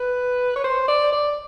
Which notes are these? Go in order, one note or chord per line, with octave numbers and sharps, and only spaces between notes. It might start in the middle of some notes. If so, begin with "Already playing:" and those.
Already playing: B4
C#5
C5
D5
D5